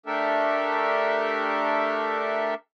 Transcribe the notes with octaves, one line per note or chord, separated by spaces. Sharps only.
A3 D4 G4 A4 A#4 E5